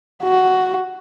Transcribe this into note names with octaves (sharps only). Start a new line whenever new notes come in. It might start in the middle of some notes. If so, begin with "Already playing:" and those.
F#4